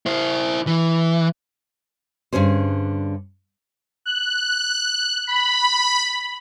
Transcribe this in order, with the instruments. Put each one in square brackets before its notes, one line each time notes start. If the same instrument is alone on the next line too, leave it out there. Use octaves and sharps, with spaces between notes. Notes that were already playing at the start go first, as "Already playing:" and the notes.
[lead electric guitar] E4 C5
E3
[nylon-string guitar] G2 D3 C#4 G#4 C5
[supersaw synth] F#6
B5